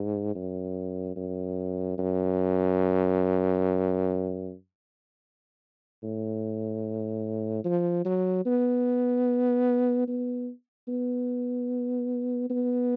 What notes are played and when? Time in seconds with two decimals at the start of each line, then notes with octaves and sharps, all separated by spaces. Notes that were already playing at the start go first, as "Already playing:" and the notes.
Already playing: G#2
0.36 F#2
1.17 F#2
1.98 F#2
6.03 A2
7.65 F3
8.05 F#3
8.46 B3
10.08 B3
10.89 B3
12.50 B3